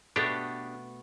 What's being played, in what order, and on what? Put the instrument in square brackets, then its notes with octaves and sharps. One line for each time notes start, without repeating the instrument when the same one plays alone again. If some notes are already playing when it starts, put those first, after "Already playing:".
[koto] B2 A3 [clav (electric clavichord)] B3 D4 G4